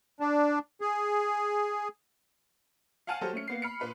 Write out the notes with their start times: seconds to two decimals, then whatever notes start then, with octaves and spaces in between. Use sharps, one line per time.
0.20 D4
0.81 G#4
3.07 F5 F#5 G#5 A5 F6 D#7
3.21 F#3 G4 A4 C5
3.33 A3 C#4 C#7
3.47 A#3 B3 C7
3.62 B5 F6 C#7
3.80 A#2 B4 B5